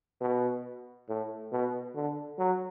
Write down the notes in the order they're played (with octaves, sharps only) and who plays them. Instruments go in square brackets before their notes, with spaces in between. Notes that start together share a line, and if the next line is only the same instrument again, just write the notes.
[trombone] B2
A2
B2
D3
F#3